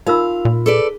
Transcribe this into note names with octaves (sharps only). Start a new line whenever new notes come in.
D#4 F4 A#4 F5 B5 E6
A#2
G#4 A4 B4 D5